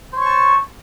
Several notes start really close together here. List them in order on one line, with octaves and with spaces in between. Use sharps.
C5 C#5 C#6 A5